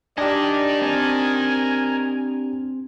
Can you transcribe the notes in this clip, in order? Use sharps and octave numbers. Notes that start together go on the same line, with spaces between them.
D4 G4 A#4 D5 D#5 G#5 A#5
C4 G#5 A5